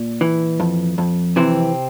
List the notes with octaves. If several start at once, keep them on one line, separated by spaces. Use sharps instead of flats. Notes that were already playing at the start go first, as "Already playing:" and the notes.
Already playing: A#2
E3
F2
F2
C3 E3 C4